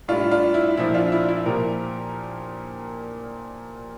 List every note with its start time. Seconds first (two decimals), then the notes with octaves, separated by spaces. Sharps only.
0.08 A2 G3 D4 F4
0.31 D4 F4
0.54 E4
0.77 A#2 F3 E4
0.94 D4 F4
1.12 E4
1.29 E4
1.46 A#2 F3 G4 A#4